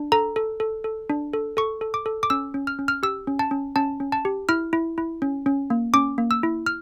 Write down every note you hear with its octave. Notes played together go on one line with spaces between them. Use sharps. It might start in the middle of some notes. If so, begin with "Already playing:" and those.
Already playing: D4
A4 A#5
A4
A4
A4
D4
A4
A4 C#6
A4
D6
A4
D6
C#4 E6
C#4
F6
C#4
F6
G4 E6
C#4
A5
C#4
C#4 A5
C#4
A5
G4
E4 F6
E4
E4
C#4
C#4
A#3
C#4 D6
A#3
E6
E4
F6